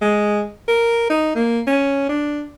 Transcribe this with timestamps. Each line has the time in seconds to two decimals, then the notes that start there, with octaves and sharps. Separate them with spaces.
0.02 G#3
0.68 A#4
1.10 D#4
1.35 A#3
1.67 C#4
2.09 D4